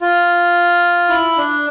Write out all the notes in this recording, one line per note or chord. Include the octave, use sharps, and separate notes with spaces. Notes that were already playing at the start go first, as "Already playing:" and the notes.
F4
E4
D4